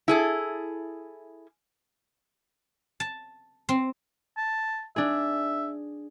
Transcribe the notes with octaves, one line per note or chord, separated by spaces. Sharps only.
E4 G#4 A4
A5
C4
A5
D4 G#4 E5